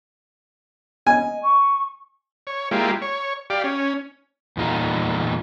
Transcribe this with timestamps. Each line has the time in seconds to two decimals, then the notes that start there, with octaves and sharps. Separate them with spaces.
1.07 D#5 G#5
1.42 C#6
2.47 C#5
2.71 G#3 A#3 E4 F4 G4
3.02 C#5
3.50 G4 D5 F5
3.64 C#4
4.57 E2 A#2 D#4 F4